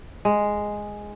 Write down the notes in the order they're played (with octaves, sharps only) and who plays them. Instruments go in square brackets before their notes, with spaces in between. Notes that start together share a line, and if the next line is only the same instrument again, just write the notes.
[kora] G#3